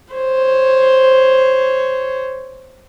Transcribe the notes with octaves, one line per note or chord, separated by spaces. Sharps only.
C5 C#5